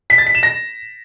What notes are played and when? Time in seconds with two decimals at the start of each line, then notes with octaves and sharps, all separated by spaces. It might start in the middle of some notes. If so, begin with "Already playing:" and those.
0.10 B6
0.18 A6
0.26 B6
0.35 E7
0.43 A#6